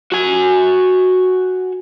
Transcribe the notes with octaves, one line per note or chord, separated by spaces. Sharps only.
F#4 G#5